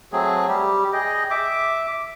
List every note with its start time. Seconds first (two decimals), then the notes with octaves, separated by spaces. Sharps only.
0.12 F#3 A3 C4 G#4
0.48 G3 G4
0.93 G#4 D#5 G5
1.30 E5 D6